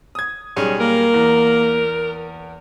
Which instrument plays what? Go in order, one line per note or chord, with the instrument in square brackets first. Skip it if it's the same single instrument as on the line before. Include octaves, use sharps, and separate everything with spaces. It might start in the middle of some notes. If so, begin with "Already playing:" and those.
[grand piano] D#6 G#6
[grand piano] B1 G3 G#4 [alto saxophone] C#4
[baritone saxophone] A#3 [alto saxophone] A#4
[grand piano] E2